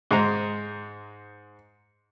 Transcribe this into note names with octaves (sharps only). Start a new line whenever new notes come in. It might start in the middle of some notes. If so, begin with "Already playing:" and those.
G#2 G#3 C5 A#5